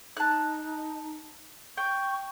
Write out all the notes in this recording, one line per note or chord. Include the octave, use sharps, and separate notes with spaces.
D#4 A5 F#6
G5 C#6